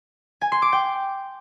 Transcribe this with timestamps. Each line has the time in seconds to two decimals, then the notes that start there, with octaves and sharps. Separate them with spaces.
0.41 G#5
0.52 C6
0.62 D6
0.72 G5